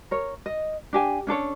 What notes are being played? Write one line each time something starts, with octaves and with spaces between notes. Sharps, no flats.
A#4 C#5
D#5
D4 G4 G#5
C#4 D4 A4 C#5